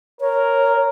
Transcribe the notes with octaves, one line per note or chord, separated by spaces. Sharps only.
A#4 C#5